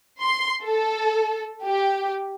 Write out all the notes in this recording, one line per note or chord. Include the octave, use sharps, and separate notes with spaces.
C6
A4
G4